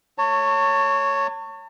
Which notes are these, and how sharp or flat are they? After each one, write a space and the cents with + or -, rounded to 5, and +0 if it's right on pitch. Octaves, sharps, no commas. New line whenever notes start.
A3 +0 C#5 +0 A5 +40